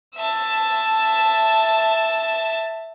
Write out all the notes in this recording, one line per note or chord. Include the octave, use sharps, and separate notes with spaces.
E5 A5